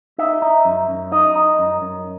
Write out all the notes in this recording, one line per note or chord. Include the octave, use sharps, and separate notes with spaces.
D#4 E5
D#4
F#2
F#2
D#4 D#5
D#4
F#2
F#2